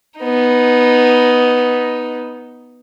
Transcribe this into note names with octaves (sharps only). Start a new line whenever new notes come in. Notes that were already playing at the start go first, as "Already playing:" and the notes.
B3 D#4